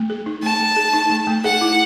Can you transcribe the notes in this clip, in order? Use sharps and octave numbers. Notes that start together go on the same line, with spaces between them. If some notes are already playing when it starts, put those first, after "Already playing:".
Already playing: A3
G#4
D#4
A3 A5
A3
G#4
D#4
A3
A3
G#4 F#5
E4